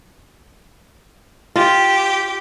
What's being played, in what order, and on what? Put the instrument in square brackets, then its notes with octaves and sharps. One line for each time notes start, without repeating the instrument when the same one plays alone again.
[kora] F4 [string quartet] G4